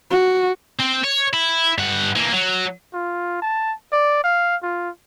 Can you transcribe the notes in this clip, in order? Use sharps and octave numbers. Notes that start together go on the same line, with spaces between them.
F#4
C4
C#5
E4
G2 F#5
E3 A#3
F#3
F4
A5
D5
F5
F4